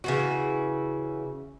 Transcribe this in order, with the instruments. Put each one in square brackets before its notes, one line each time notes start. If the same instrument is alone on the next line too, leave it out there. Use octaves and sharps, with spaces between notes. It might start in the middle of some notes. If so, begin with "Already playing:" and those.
[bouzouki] C#3 E3 F#4